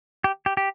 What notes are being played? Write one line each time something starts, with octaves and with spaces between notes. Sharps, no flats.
G4
G4
G4